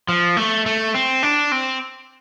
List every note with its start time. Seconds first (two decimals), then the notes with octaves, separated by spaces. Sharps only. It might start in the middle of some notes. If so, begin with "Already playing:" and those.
0.08 F3
0.37 A3
0.66 A3
0.94 C4
1.23 D4
1.52 C4